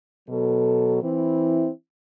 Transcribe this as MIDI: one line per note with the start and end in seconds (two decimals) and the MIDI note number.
0.29 1.00 47
0.29 1.00 54
0.29 1.00 69
1.02 1.69 52
1.02 1.69 60
1.02 1.69 64